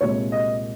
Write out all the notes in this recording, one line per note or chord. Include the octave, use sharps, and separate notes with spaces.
C2 A#2 G#3 C#5
D#5